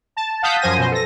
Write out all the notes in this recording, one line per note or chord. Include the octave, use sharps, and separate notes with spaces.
A5
F5 F#5 A5 D#6 G6 B6
F#2 F3 C5 G#5 A#6 D#7
B2 C5
A4 A#6